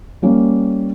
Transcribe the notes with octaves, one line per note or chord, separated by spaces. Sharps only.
G3 A#3 C#4